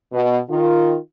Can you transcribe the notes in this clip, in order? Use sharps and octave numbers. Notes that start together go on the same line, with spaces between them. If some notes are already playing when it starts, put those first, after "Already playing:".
B2
D#3 F4